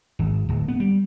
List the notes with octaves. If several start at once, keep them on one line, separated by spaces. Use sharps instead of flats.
G#1
D1
B3
G3